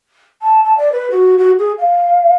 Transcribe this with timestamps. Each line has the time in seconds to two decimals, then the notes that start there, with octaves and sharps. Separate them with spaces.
0.42 A5
0.64 A5
0.78 D5
0.92 B4
1.10 F#4
1.38 F#4
1.58 G#4
1.78 F5